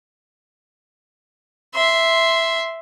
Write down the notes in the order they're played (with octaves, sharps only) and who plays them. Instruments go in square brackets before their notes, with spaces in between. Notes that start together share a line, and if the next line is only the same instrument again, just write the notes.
[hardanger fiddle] E5 C6